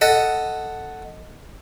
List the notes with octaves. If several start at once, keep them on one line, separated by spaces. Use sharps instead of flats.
A4 D#5 F#5